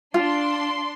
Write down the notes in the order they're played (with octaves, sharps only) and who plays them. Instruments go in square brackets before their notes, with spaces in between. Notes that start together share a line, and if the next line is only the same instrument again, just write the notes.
[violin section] D4 C6 [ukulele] F4